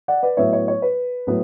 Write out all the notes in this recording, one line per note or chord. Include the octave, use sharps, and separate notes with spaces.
D5 F#5
B4 D5
A2 F#3 B3 E4 C#5 E5
C#5
C#5
B4
A2 F#3 B3